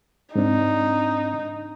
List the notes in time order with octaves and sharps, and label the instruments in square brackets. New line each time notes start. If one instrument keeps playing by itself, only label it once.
[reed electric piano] G#2 C4 D4 [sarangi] D#4